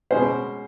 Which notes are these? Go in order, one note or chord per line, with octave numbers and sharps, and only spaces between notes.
B2 G#3 C#4 C5